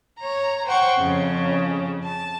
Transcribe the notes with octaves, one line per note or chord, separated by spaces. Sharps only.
C#5 A#5
C5 F#5 G5 C#6
F2 C#3 C#4
A5